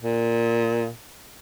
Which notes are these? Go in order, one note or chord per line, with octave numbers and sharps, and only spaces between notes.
A#2